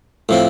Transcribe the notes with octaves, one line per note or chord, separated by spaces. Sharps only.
A2 F3 C4